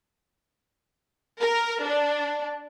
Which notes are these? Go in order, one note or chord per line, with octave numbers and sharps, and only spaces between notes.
A#4
D4